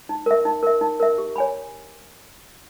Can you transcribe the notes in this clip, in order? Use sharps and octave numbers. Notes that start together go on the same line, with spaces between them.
D#4
A#4 E5
D#4
A#4 E5
D#4
A#4 E5
G4
C#5 G#5 B5